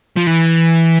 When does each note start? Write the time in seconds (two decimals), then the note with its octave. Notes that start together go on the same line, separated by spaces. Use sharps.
0.16 F3
0.27 E3